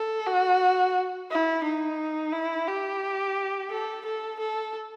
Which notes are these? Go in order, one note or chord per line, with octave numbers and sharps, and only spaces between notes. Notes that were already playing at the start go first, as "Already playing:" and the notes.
Already playing: A4
F#4
E4
D#4
E4
G4
A4
A4
A4